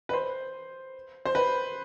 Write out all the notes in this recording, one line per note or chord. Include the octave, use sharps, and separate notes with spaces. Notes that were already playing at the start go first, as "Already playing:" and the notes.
B4
C5
C5
B4